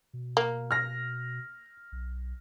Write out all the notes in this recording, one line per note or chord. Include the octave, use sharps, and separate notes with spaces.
B2
A#3
F6 A#6
B1